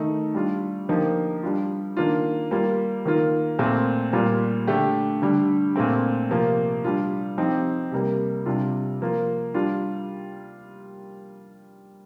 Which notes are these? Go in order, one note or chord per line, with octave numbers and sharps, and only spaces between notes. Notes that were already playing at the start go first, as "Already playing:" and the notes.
Already playing: D#3 A3 D#4
G3 D4 F4
D3 F3 A#3 D#4 G4
G3 D4 F4
D#3 A#3 D4 F4
G3 A#3 F4
D#3 A#3 F4
A#2 A3 C4
A#2 G3 A#3 F4
D3 A3 D4 G4
D3 G3 D4
A#2 A3 C4
C3 F3 A#3 F4
G3 D4 F4
F3 C4 D#4 G4
C3 G3 A#3
C3 G3 D4 F4
F3 A#3 F4
G3 D4 F4